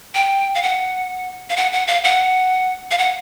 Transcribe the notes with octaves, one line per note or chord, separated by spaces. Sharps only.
G5
F5
F#5
F5
F#5
F#5
F5
F#5
F5
F#5